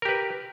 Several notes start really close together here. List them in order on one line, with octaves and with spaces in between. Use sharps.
A#4 G4 B4